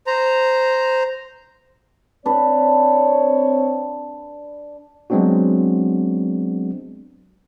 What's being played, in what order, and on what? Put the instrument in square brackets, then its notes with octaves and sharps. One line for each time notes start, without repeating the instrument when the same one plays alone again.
[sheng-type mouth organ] C5 A#5
[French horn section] C4 C#5 [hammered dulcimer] D4 B4
[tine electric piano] F#3 G#3 B3 C4 D4 F#4